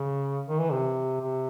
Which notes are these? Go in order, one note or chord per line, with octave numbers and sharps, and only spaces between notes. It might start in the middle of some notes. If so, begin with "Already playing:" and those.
Already playing: C#3
D#3
E3
C3
C3